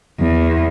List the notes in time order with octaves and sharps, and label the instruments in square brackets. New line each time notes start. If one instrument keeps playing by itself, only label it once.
[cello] E2